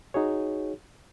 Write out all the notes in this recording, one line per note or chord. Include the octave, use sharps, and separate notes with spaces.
D#4 F#4 G#4 C#5